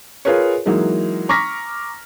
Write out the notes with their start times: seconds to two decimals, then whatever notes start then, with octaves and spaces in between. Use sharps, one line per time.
0.25 F4 G#4 A#4 B4 C#5
0.66 E3 F#3 G#3 A#3 D#4
1.29 A#5 C#6 D6 F6 A#6 B6